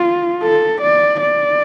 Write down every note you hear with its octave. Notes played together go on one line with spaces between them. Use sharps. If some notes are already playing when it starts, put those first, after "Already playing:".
Already playing: F4
A4
D5
D5